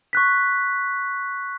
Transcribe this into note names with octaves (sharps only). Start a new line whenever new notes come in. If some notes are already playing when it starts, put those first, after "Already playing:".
C#6 F#6 B6